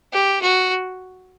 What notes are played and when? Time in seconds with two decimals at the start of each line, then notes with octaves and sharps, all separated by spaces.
0.13 G4
0.42 F#4